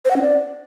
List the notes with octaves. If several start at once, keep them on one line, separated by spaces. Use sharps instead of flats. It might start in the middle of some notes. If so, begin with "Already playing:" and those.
C5
F#5
C#4
D5